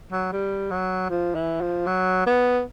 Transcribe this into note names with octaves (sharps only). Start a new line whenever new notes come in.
F#3
G3
F#3
F3
E3
F3
F#3
B3